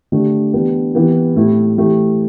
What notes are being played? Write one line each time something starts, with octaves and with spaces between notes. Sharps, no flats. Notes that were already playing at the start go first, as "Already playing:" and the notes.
D3 A3 D4 G4
E3 B3 D4 G4
E3 B3 E4 G4
A2 A3 E4 G4
E3 A3 E4 G4